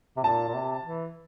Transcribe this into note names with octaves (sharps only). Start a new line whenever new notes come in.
C3
A#2 A5
A#2
C3
E3